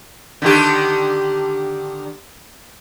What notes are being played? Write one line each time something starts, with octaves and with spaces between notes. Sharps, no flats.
D3 D#3 G4